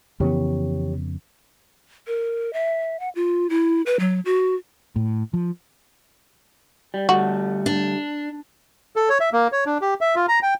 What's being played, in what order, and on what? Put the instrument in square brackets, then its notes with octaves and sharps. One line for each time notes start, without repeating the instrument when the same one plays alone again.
[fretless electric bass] F2 C#3 B3 [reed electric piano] E3 G4 C#5
[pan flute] A#4
E5
F#5
F4
E4
B4
F#3
F#4
[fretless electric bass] A2
F3
[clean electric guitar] G3
[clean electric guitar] D3 G3 A3 [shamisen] F#4
[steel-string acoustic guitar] D4
[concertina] A4
C#5
E5
A#3
C#5
D4
G4
E5
F4
A#5
G5